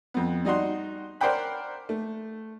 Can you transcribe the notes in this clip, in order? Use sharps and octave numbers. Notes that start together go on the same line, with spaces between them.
F2 B3
G3 D#4 F#4 C6
A#4 C5 D5 F#5 G5 B5
A3